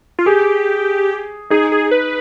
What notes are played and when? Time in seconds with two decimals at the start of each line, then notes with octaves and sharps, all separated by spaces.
0.19 F4
0.26 G4 G#4
1.50 D#4 G#4
1.72 G#4
1.91 B4